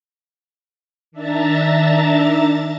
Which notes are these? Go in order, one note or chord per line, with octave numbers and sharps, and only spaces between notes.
D#3 D4 E5 A5 A#5 A6